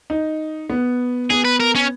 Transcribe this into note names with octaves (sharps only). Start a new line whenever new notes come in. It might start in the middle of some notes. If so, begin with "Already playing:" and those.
D#4
B3
B3 G#4
B4
A#4
C#4